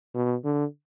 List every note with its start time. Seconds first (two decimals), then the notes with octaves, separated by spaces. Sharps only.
0.15 B2
0.44 D3